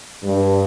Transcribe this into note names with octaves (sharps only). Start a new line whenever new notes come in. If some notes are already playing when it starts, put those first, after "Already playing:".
G2